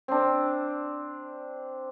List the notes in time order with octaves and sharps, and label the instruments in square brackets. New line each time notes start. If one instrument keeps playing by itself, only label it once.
[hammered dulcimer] C4 D4